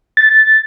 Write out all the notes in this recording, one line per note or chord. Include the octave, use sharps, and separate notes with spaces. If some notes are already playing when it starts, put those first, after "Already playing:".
A6